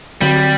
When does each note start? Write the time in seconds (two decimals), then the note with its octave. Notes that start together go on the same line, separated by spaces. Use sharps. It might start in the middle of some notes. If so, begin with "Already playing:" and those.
0.21 D3 F#3 G3 C4 F#4